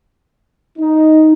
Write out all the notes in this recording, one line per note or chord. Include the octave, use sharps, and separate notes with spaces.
D#4